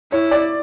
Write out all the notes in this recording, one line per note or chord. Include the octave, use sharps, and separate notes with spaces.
E4 C#5
D5